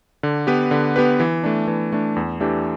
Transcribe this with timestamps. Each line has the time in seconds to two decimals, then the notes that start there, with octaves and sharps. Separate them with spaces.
0.23 D3
0.47 B3 G4 B4
0.71 D3
0.96 B3 G4 B4
1.20 E3
1.44 A3 D4
1.68 E3
1.92 A3 D4
2.16 E2
2.40 E3 A3 D4 G4